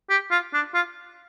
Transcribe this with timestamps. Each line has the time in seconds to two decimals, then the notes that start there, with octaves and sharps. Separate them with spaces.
0.10 G4
0.31 F4
0.53 D4
0.74 F4